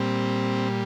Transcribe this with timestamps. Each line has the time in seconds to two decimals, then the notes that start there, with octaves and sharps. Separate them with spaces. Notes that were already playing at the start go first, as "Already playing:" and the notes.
Already playing: A#2 G3 C4